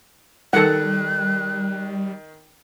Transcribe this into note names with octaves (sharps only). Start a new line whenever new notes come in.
D#3 G3 A4 F#5 F#6